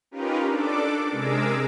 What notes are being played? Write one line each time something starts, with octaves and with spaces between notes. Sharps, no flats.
C#4 D#4 F4 G4 A#4 B4
D4 A4 D5 D6
C3 G#3 G#4 A#4 D6 E6